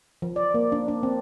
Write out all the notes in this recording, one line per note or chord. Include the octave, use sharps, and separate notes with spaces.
F3
D5
A#3
D4
D4
C4